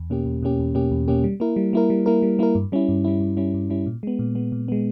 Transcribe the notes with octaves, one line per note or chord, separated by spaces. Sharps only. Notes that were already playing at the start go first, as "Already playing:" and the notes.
Already playing: E2
B2 A#3 C#4 G4
E2
B2 A#3 C#4 G4
E2
B2 A#3 C#4 G4
E2
B2 A#3 C#4 G4
G3
A#3 E4 A#4
G3
A#3 E4 A#4
G3
A#3 E4 A#4
G3
A#3 E4 A#4
G2
G3 C#4 E4
G2
G3 C#4 E4
G2
G3 C#4 E4
G2
G3 C#4 E4
A#2
G#3 B3
A#2
G#3 B3
A#2
G#3 B3